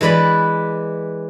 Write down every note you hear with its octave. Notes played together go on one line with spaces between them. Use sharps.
E3 G#3 B4 D5 B5